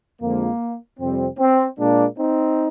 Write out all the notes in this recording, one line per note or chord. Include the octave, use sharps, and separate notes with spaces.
F2 D3 F3 G#3 A#3
F2 C3 G3 C4
C4
A#2 G#3 A#3 D4
C4 D#4